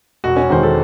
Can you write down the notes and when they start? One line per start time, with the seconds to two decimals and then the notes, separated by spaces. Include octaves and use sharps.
0.24 E1 F#4
0.36 C#4
0.50 E2 D#3 G#3 C5
0.63 A4